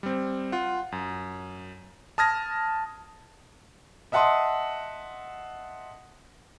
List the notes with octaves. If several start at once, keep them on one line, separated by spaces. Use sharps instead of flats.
G3 C4
F4 F#5
F#2
A5 D#6 F6 G#6 A#6
D#5 E5 F#5 A5 C6 D#6